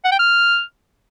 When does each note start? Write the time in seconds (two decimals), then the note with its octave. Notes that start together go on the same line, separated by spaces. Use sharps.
0.05 F#5
0.12 G5
0.19 F6